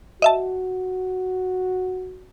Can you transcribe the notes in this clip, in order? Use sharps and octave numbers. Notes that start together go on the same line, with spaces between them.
F#4 D#5 E5 A5